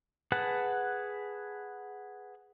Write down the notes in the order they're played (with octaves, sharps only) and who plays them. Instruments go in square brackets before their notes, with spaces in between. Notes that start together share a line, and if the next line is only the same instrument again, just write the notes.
[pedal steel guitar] G#4 B4 F#5 A5